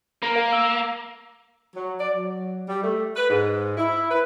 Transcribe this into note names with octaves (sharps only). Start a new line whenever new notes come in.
A#3 A#4
F5
E6
F#3
D5
F#3
G3
A3
B4
G#2
E4
B4